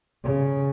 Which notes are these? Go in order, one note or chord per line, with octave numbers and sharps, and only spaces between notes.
C#3